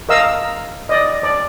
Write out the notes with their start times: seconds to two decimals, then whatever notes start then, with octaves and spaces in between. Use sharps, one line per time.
0.09 A#4 D#5 F5 E6
0.89 D5 D#5
1.23 D5